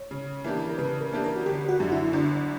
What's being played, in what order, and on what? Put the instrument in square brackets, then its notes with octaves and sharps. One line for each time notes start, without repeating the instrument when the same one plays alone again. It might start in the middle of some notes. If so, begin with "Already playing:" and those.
Already playing: [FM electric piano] C#5
[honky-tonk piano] C#3
E3 A#3 D4 G4
[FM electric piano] A#4
[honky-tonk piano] C#3 [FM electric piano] B4
[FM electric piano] A#4
[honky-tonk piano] E3 A#3 D4 G4
[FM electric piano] A#4
F#4
[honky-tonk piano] G1 [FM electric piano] G4
[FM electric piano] F#4
[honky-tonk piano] F#2 D3
[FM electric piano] E4
[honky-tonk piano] G1 [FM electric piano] D4